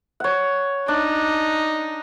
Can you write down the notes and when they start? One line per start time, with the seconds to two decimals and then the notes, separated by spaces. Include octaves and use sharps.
0.20 C#5 F#5
0.88 D4 D#4